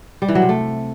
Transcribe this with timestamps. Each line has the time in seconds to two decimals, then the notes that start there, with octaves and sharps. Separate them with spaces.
0.22 G3
0.28 E3
0.35 F#3
0.42 C3
0.49 A3